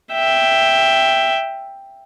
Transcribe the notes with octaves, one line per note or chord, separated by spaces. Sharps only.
E5 G5